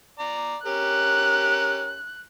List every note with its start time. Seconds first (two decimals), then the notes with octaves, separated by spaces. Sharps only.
0.19 D5 A#5
0.66 C#4 G4 A#4 F#6